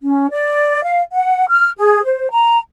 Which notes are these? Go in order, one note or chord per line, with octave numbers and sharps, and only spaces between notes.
C#4
D5
F5
F#5
F6
G#4
C5
A#5